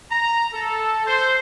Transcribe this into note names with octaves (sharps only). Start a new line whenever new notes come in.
A#5
A4
C5